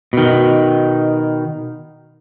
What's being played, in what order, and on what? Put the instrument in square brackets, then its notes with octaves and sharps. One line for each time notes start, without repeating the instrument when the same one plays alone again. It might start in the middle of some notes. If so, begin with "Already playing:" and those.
[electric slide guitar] B2 D#3